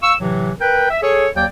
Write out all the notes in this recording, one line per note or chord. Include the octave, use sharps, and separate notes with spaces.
F5 C#6 E6
A2 C3 E3 F#3
A#4 B4 G5
E5
G#4 A4 C#5
D#2 F#3 A#3 D5 G5